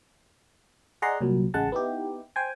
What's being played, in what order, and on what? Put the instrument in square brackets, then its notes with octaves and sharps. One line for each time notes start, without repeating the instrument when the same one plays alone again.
[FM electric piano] G#4 D5 D#5 F#5 A#5 C6
C2 A#2 F#3
A1 C#3 G#3 F#5 A5
B3 D#4 E4 G4
C5 G5 G#5